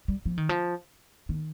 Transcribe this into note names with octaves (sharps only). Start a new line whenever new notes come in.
G3
F3
D#3
F3
D#3